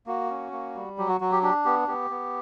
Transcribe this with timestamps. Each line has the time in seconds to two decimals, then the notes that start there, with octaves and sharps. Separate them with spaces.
0.07 A#3 F#4
0.30 C#4
0.52 A#3
0.75 G3
0.98 F#3 G4
1.09 F#4
1.21 F#3 F#4
1.32 G4
1.43 D4 G4
1.65 B3 G4
1.88 B3 G4
2.10 B3